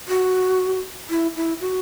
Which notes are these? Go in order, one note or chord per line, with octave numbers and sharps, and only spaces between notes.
F#4
E4
E4
F#4